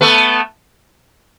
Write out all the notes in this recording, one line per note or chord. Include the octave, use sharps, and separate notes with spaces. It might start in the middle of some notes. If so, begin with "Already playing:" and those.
A3 B3